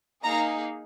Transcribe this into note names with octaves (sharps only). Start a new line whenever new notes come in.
A#3 D#4 G#4 A#5